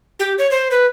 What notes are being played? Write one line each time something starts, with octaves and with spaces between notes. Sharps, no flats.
G4
C#5
C5
B4